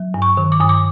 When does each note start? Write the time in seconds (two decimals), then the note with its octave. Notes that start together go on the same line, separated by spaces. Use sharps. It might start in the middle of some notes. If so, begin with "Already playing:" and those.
Already playing: F#3
0.14 G2
0.22 C#6
0.37 D#3
0.52 D6
0.60 G2 D#6
0.69 D6